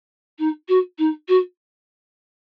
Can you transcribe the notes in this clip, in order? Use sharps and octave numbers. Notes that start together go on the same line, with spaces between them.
D#4
F#4
D#4
F#4